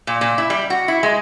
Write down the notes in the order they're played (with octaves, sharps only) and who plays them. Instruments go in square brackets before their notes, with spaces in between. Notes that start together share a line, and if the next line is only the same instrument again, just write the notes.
[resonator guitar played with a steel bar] A#2
A#2
E4
G3
F#4
E4
G#3